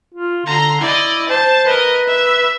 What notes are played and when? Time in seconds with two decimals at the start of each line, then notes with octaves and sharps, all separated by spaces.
0.14 F4
0.46 D3 A#5 C6
0.81 E4 D5 D#5
1.29 C5 A5
1.66 A#4 B4 D#5
2.07 E5